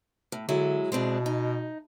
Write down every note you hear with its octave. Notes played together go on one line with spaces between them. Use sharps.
A2
D3 F#3 G#3 E4
B2 G#3 C4 D4
D#4